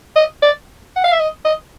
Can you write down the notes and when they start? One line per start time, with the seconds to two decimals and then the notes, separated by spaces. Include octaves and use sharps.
0.16 D#5
0.42 D5
0.96 F#5
1.04 F5
1.12 E5
1.20 D#5
1.45 D#5